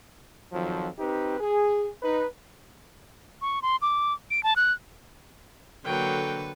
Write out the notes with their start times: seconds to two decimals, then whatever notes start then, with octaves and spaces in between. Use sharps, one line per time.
0.52 F2 D#3 F3 F#3
0.98 C4 D#4 G4 B4
1.39 G#4
2.03 D#4 B4
3.42 C#6
3.62 C6
3.82 D6
4.31 D7
4.43 A5
4.56 F#6
5.85 D3 F#3 A#3 A4 B4 G5